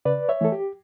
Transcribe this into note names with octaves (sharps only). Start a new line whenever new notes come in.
C#3 B4 D5
C#5 E5
E3 A3 A4
G4